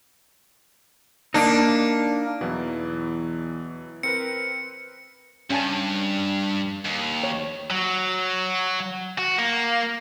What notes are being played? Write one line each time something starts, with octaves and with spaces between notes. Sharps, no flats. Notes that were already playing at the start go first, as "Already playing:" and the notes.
A#3 D4 D#4
E2 B2 E3 F#3
C4 A#4 B4 C#7
G2 C#4 G#5 A5
D#2
C#5
F#3
F#4
A#3